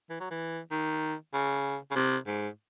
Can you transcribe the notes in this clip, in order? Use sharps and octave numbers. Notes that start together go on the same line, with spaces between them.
E3
F#3
E3
D#3
C#3
C#3
C3
G#2